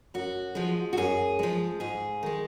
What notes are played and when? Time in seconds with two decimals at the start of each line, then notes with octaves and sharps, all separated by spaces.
0.14 F#2 F#4
0.55 F3 G#3
0.93 F#4
0.97 F#2 G#4
1.39 F3 G#3
1.80 G#2 G#4
2.23 D#3 G#3